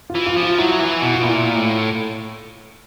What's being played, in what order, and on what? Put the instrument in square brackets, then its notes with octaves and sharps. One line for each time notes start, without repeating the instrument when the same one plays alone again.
[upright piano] F4
[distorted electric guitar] E3
[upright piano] F4
[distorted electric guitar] F3
[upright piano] F4
[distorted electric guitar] F#3 [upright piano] E4
[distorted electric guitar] E3
B2
[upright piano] F4
[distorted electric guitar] A#2 [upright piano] E4
[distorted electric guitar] A2